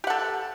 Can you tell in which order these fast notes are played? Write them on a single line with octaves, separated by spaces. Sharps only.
G4 F#5 A4